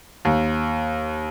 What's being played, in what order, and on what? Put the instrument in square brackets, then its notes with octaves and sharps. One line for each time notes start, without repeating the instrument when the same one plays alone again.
[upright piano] D#2